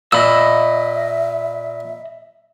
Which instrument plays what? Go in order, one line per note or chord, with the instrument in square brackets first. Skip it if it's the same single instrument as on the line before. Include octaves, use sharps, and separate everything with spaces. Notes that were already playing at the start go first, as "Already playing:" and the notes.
[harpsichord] A#2 [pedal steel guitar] D#5 B5 E6 [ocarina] E5